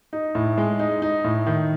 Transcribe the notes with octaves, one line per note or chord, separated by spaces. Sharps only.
D#4
A2
G#3
D#4
D#4
A2
D#3